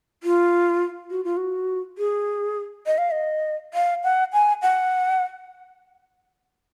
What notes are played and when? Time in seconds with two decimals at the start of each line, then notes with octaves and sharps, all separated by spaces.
0.23 F4
1.11 F#4
1.24 F4
1.37 F#4
1.98 G#4
2.86 D#5
2.98 F5
3.11 D#5
3.74 F5
4.04 F#5
4.33 G#5
4.62 F#5